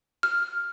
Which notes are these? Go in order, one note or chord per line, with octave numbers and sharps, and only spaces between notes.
F6